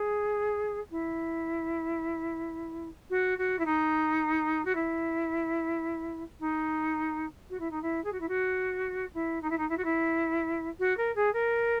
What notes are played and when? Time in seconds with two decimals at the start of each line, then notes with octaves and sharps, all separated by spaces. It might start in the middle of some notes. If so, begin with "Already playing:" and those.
Already playing: G#4
0.90 E4
3.10 F#4
3.38 F#4
3.58 E4
3.65 D#4
4.65 F#4
4.75 E4
6.39 D#4
7.50 F#4
7.59 E4
7.71 D#4
7.82 E4
8.04 G#4
8.12 F#4
8.20 E4
8.28 F#4
9.14 E4
9.41 D#4
9.50 E4
9.57 D#4
9.69 E4
9.77 F#4
9.84 E4
10.79 F#4
10.97 A#4
11.15 G#4
11.33 A#4